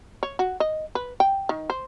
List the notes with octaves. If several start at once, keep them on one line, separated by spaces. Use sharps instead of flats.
C#5
F#4
D#5
B4
G5
D#3
C5